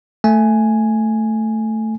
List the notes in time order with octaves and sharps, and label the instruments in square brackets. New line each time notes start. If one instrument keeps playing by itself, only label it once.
[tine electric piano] A3 G#5